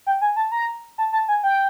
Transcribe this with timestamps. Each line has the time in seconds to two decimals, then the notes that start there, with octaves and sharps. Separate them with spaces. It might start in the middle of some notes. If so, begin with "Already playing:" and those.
0.06 G5
0.21 G#5
0.36 A5
0.52 A#5
0.98 A5
1.13 A5
1.28 G#5
1.43 G5